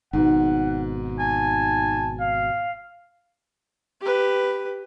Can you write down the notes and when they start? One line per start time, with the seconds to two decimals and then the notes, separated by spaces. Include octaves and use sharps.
0.13 G#1 G#2 B2 F#5
1.19 G#5 A5
2.20 F5
4.01 G4 B4